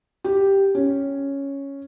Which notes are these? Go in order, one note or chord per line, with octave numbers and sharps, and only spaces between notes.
G4
C#4